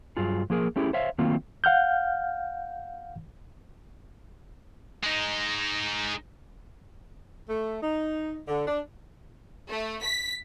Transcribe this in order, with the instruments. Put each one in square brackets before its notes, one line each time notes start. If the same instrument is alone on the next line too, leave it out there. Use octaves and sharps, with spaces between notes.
[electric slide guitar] G2 F#3 F4 G#4
F3 A#3 G#4 A#4
A3 C#4 E4 G4 G#4
C5 C#5 E5 F5
D#3 F#3 A3 A#3 C4 F4
[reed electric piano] F5 F#5 F6 G6
[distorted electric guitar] G#3 D#4
[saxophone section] A3
D#4
D3
D4
[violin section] A3
B6